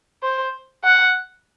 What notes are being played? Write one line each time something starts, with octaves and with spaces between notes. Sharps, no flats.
C5
F#5